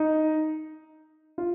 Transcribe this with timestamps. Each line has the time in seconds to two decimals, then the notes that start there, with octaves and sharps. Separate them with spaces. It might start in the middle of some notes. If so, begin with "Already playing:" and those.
Already playing: D#4
1.38 F4